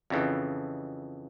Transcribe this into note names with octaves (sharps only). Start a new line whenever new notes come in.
F2 C#3 E3